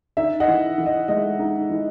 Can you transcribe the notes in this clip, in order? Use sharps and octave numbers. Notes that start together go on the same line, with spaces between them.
D#4 E5
D#5 F#5
E3
E3
D#5
G#3 D#5
D#4
E3